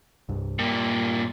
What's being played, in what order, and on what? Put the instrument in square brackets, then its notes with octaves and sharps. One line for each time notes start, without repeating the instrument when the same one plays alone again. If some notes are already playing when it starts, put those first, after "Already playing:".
[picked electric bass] C2 G2
[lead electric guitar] G2 A#2 [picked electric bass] A#3